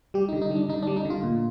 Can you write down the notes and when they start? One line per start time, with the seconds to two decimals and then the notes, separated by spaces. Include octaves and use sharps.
0.14 G3 G4
0.29 D#4
0.33 D3
0.42 D#4
0.51 G3 D4
0.69 D3 D#4
0.83 D4
0.87 G3
0.96 D#4
1.05 D3
1.10 F4
1.23 A#2